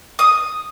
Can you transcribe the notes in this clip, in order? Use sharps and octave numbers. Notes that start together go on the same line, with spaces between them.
D#6